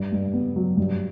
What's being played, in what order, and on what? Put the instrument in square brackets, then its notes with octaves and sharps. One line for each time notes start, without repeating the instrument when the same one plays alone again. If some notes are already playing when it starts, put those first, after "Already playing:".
Already playing: [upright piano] G2
G2
B3
F#3
G2